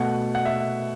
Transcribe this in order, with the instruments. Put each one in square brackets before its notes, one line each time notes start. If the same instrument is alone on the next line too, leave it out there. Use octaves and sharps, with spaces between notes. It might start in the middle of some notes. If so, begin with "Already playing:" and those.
Already playing: [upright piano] B2 A3 F#5
F#5
E5